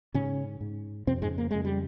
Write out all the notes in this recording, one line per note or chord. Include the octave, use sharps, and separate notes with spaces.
G#2 C#3 C#4
G#2
F2 C3 C#3 C4
G#2 G#3
A#3
F2 C#3 G#3
G3